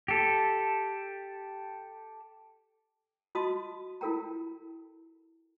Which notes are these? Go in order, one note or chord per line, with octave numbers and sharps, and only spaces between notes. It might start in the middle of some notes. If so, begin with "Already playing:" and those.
G4 A4
F4 F#4 D#5 A5 C6 D#6
E4 F4 A4 A#4 G5 A#5